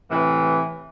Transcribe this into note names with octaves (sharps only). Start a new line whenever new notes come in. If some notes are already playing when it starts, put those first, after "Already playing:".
A2 C3 E3